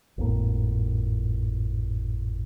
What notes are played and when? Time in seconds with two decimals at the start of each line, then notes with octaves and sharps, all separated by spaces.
0.18 G#1 F2 A2 A#3